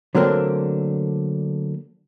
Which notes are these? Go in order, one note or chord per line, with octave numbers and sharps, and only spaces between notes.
D3 F#3 A3 A#3 C4 D4